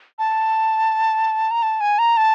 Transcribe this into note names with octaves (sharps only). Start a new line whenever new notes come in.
A5
A#5
A5
G#5
A#5
A5